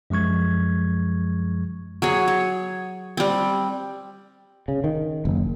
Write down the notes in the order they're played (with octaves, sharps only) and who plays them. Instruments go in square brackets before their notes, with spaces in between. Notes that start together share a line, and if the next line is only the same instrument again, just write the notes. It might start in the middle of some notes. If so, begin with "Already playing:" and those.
[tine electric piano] F#2 F3 G#3 C#6 G#6
[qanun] F#3 G#4 C#5
C#5
G3 C4
[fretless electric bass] C#3
D#3
F#1